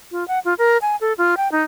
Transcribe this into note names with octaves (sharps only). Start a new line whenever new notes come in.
F4
F#5
F4
A#4
G#5
A4
F4
G5
D#4